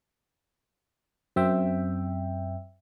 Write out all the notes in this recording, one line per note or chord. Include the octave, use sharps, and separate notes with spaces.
F#2 C4 E5 G5